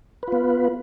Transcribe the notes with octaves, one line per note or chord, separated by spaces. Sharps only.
B3 F4 B4